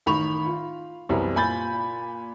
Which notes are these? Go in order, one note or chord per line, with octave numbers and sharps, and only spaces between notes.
A1 D#3 B5 C#6 F7
F4
C2 F#2 E3 G3 B3 C4
A#2 F4 G#5 B5 G6 A6